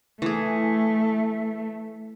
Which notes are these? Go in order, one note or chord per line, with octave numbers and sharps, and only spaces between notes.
E3 A3 G#4